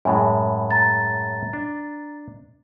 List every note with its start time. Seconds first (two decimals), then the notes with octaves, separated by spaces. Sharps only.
0.05 F#2 A2 G#3 G#5 B5
0.71 A#5 A6
1.53 D4